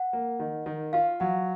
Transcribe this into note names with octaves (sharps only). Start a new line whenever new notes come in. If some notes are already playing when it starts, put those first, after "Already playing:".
Already playing: F#5
A#3
D#3
D#3
F4 F5
F#3 F#5